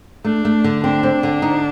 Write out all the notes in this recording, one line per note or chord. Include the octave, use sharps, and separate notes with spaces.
A3 D4
A3
D3
C4 D4
C4
D3
D#4